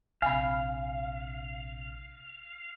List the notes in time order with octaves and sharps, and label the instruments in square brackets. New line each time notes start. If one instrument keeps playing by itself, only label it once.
[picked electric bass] A#1 C3 [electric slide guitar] F5 [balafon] G#5 B5